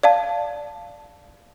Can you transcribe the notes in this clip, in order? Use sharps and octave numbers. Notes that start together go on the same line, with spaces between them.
D5 F5 A5